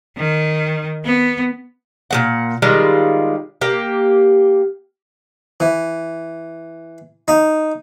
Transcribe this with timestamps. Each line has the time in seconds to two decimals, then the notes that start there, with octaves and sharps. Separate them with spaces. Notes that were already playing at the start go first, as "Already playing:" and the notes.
0.17 D#3
1.05 B3
2.11 A#2 G#3 F#5
2.62 D#3 G3 G#3 F4
3.61 A#3 G4
5.60 E3
7.28 D#4